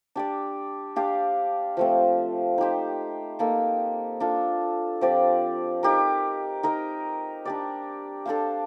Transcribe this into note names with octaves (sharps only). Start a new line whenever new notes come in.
D4 G4 D5
D4 G4 C5 F5
F3 A3 C4
D#4 G4 C5
A#3 D#4 A4
D4 F4 A4
F3 C4 G4 D5
D#4 G4 A#4
D#4 A#4 D#5
D4 G4 D5
D4 A4 C5 F5